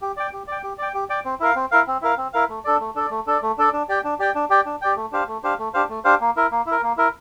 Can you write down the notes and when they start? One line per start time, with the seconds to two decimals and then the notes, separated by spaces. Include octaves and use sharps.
0.02 G4
0.17 D5 G5
0.33 G4
0.47 D5 G5
0.63 G4
0.78 D5 G5
0.94 G4
1.10 D5 G5
1.25 C4
1.40 E4 A#4 F5
1.56 C4
1.71 E4 A#4 F5
1.87 C4
2.02 E4 A#4 F5
2.18 C4
2.33 E4 A#4 F5
2.49 A3
2.65 D4 A4 D5
2.80 A3
2.95 D4 A4 D5
3.10 A3
3.27 D4 A4 D5
3.42 A3
3.58 D4 A4 D5
3.73 D4
3.89 G4 D5 G5
4.04 D4
4.19 G4 D5 G5
4.35 D4
4.50 G4 D5 G5
4.66 D4
4.82 G4 D5 G5
4.96 A3
5.12 D4 G4 C5 F5
5.28 A3
5.44 D4 G4 C5 F5
5.59 A3
5.74 D4 G4 C5 F5
5.90 A3
6.04 D4 G4 C5 F5
6.20 A#3
6.36 E4 A#4
6.52 A#3
6.66 E4
6.71 A#4
6.83 A#3
6.97 E4 A#4